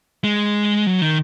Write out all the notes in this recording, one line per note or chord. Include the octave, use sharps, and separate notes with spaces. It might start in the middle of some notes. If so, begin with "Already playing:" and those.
G#3
F#3
D#3